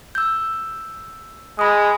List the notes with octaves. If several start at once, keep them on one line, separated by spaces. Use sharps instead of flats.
E6 G6
G#3 B5 D#6